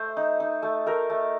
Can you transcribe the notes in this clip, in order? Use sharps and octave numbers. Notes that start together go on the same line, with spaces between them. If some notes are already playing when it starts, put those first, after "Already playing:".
Already playing: A3 C5
D#4
D#4
A3
A3 A#4
A3